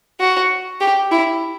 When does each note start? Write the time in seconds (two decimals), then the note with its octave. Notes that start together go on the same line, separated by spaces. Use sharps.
0.20 F#4
0.80 G4
1.11 E4